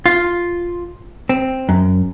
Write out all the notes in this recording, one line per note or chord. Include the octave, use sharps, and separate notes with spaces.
F4
C4
F#2